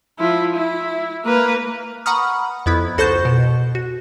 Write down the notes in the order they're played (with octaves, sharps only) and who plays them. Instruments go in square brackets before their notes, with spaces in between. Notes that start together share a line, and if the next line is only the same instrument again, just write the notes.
[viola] F3 E4
E4
A#3 B4
[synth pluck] F#5 A#5 B5 C#6 D#6 F6
F2 B3 E4 B5
C#2 F#4 A4 C5 C#6 G6
B2
F#4